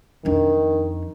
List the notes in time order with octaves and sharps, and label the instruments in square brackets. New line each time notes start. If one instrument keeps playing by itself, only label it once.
[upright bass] F2 D4 [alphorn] D#3